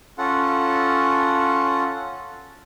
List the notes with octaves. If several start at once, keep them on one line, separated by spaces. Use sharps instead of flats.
C#4 F4 A4 F#5